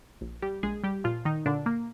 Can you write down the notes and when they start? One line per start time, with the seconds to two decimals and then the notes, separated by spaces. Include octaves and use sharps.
0.21 A#1
0.42 G3 G4
0.63 A#1 G#3 G#4
0.84 G3 G4
1.04 A#2 F3 F4
1.25 D#3 D#4
1.46 A#2 D3 D4
1.66 A#3